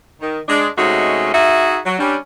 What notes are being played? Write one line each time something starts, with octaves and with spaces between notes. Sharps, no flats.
D#3
G#3 D4
C3 G#3 A3 C#4 D#4 F#4
D#4 F#4 G#4 E5
F#3
G3 C#4 D4